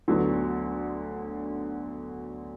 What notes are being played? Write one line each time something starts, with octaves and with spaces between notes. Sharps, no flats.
D2 D3 F#3 B3